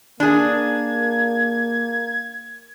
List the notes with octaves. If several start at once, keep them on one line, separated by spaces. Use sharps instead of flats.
A#3 D4 G#4 G#6